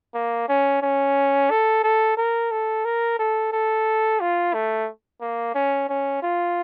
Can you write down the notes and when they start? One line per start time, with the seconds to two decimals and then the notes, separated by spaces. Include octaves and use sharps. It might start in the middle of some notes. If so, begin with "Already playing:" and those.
0.14 A#3
0.49 C#4
0.82 C#4
1.50 A4
1.84 A4
2.17 A#4
2.51 A4
2.85 A#4
3.19 A4
3.52 A4
4.20 F4
4.54 A3
5.21 A#3
5.55 C#4
5.89 C#4
6.22 F4